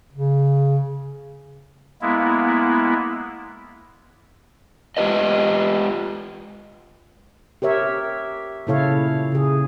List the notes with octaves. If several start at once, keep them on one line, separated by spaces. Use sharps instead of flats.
C#3
G#3 A#3 B3 E4
G#3 F4 G4 B4 D#5
G4 A#4 C#5 E5
A#2 C#3 E4 A4 C#5 F5
C#3 G#4